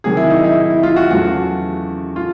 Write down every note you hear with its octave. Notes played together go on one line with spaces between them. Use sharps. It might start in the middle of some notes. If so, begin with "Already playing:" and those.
C3 D#3 F#3 G#4
E4
D#4
E4
E4
E4
F4
F#4
E2 C#3 F#3 A3 F#4
F4